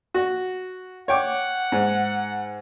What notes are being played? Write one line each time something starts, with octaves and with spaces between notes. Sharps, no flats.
F#4
C#5 F#5 G5 D6
G#2